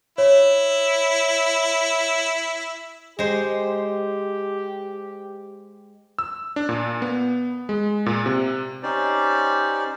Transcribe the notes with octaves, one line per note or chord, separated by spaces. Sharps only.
E4 C#5
G#3 G4 C5
E6
D4
A#2
B3
G#3
A#2
C3
C#4 D#4 G4 C5 D5